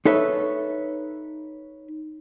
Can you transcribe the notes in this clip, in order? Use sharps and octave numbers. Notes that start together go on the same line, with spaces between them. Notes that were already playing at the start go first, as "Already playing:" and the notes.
D#4 A4 B4 C#5 E5